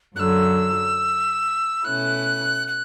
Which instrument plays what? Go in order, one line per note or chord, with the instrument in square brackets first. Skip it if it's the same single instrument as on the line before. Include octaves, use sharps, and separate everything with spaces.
[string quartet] F#2 D3 F#3 [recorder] E6 F#6
[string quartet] B2 A3 C#4 E4 [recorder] F#6
[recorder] F#6